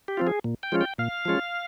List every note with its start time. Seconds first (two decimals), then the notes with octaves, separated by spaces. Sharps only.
0.08 G4
0.17 F3 C4 F4
0.27 G#4
0.44 A#2
0.63 G5
0.72 F3 G#3 C#4 F4
0.81 G5
0.98 A#2 F5
1.25 F3 G#3 C#4 F4